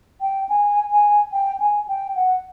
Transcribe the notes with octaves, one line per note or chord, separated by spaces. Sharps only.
G5
G#5
G#5
G5
G#5
G5
F#5